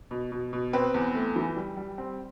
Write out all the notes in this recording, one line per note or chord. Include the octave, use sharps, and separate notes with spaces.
B2
B2
B2
C4 B4
E2
A3
E3
G3
G3
C4